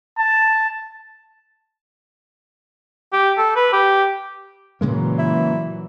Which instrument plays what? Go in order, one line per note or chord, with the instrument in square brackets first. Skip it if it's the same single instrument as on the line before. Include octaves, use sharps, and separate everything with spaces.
[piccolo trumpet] A5
[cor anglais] G4
A4
B4
G4
[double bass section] A#2 E3 F#3 [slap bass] C#3 G#3 A#3
[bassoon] E4